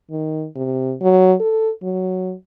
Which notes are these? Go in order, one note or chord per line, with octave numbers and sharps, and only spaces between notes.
D#3
C3
F#3
A4
F#3